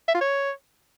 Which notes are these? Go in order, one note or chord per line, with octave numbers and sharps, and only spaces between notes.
E5
F4
C#5